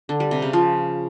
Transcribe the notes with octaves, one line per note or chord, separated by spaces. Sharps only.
D3
G3
C3
C#3
F3